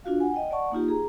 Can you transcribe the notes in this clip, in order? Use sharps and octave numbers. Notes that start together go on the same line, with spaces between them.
D4 F4 F#4 F5
F#5 G#5
D#5 G5
D5 F#5 A5 C#6
A#3 D#4 F4 G4
G#4 A#5